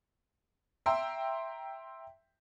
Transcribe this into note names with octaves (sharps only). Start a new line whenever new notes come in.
E5 G5 A#5 C6 E6